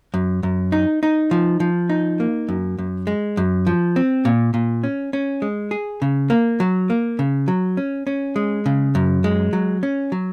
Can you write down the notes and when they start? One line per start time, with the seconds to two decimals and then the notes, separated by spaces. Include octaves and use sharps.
0.14 F#2
0.43 F#2
0.72 D#4
1.03 D#4
1.31 F3
1.60 F3
1.90 D#4
2.20 A#3
2.49 F#2
2.78 F#2
3.07 G#3
3.37 F#2
3.67 F3
3.96 C4
4.25 A#2
4.54 A#2
4.84 C#4
5.13 C#4
5.42 G#3
5.71 G#4
6.02 C#3
6.30 A#3
6.60 F#3
6.90 A#3
7.19 C#3
7.48 F#3
7.77 C#4
8.07 C#4
8.36 G#3
8.66 C#3
8.95 F#2
9.24 G#3
9.53 F#3
9.83 C#4
10.12 F#3